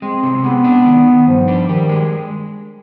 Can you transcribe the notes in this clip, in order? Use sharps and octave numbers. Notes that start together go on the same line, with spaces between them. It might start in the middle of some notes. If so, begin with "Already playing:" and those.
G#3 C4
C3
G#3 B3
D4
D#3
D#3
G2 F3
D4
D#3 G4
G#3